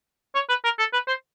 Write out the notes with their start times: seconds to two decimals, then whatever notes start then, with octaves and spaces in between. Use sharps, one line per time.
0.35 C#5
0.49 B4
0.64 A#4
0.79 A4
0.93 B4
1.07 C5